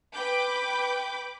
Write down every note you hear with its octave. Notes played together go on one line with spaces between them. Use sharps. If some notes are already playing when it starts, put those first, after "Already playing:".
B4 G5 B5 D6 G6 D7